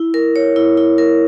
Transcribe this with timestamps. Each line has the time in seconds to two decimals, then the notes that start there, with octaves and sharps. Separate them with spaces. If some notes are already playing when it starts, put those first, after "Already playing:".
Already playing: E4
0.14 A#4
0.36 C#5
0.56 E4
0.77 E4
0.98 A#4